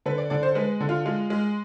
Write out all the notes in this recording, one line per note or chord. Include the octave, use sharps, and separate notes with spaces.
D3 B4
D5
D3 D5
C5
G#3 B4
D3
F4
G#3 F4
G#3